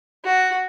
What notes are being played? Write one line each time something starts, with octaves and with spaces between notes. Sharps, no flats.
F#4